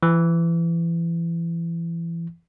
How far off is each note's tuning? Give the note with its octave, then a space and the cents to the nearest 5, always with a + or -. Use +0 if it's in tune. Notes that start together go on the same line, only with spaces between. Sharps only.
E3 +30